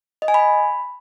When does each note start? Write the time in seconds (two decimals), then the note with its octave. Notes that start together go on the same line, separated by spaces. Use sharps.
0.22 D#5
0.28 G#5
0.34 B5